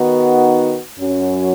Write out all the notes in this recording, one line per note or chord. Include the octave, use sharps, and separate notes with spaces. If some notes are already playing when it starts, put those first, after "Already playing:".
Already playing: D#3 B3 D#4 F#4
F#2 F#3 C#4 F#4